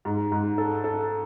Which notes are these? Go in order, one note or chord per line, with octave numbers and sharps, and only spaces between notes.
G#2
G#2
A4
A4